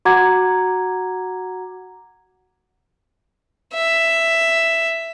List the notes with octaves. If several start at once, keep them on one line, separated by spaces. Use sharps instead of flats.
F#4 F#5 A#5 D6 G#6
E5